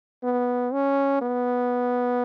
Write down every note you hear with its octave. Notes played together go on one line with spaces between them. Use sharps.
B3
C#4
B3